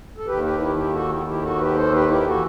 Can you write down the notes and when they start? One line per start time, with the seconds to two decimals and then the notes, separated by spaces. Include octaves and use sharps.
0.17 A4
0.26 D#2 D#3 G4 B4
0.43 G4 B4
0.60 E4 G4
0.76 E4 G4
0.93 F#4 A4
1.09 E4 G4
1.26 E4 G4
1.42 F#4 A4
1.59 G4 B4
1.75 A4 C5
1.92 G4 B4
2.08 E4 G4
2.21 B4
2.25 E3 F#4 A4